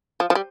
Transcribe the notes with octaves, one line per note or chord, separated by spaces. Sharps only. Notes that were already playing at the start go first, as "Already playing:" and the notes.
F3
F3
G3